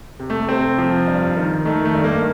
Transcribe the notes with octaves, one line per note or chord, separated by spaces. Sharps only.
C3
A3
C3 C4
F3
G2
D#3
D#3 A3
A3
G2
A#3